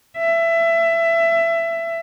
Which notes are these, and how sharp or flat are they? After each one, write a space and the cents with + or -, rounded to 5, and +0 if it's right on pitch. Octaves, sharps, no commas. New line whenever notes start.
E5 +20